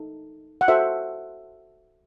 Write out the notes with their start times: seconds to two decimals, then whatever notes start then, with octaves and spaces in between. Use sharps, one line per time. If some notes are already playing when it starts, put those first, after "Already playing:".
Already playing: D#4 A4
0.61 F#5
0.68 F#4 A4 C5 E5